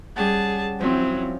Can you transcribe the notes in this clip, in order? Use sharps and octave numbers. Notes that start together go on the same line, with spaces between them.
G3 C#4 G#4 F#5 A5
F3 F#3 C4 C#4 E4